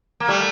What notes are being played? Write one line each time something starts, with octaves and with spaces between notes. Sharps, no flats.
A#3
G3 A3